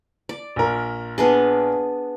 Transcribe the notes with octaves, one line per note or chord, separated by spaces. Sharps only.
D5
A#1 A#4
B3 D4 G#4